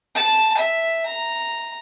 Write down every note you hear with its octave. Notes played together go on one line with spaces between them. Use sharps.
A5
E5
A#5